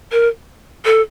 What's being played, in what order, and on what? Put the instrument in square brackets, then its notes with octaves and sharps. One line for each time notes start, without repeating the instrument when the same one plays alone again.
[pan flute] A#4
A4